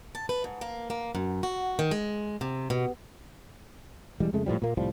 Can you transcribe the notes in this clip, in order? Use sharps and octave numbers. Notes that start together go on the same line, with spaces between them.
A5
B4
G#2
A#3
A#3
F#2
F#4
D#3
G#3
C3
B2
E1 E3 G3 G#3
F2 C#3 G#3 A3
A2 D3 F3 G3
A#2 A#3
C2 A2 F3 G3